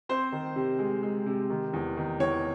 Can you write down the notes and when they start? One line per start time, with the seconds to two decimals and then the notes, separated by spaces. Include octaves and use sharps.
0.09 C4 C5
0.32 D#3
0.56 C3
0.79 G#3
1.03 G#3
1.26 C3
1.50 D#3
1.73 E2
1.97 D#3
2.20 E2 C#5